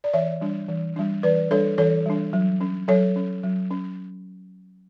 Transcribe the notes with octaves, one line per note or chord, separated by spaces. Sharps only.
D5
E3 C#5 E5
G3 D4
E3
G3 D4
E3 B4 D5
G3 D4 A4 C#5
E3 A4 C#5
G3 D4
F#3
C#4
F#3 A4 C#5
C#4
F#3
C#4